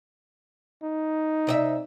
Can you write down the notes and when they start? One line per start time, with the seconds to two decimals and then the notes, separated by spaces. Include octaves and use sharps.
0.83 D#4
1.47 C3 D#5 E5